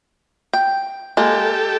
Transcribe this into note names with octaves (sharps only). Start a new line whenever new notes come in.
G5
G#3 A#3 G4 A4